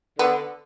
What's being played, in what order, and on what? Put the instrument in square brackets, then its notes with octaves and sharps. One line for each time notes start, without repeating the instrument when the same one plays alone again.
[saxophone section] D3 [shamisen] B3